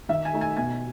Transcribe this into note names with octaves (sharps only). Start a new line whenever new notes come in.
D#3 E5
G#5
A3 D#4
G#5
B2 G#5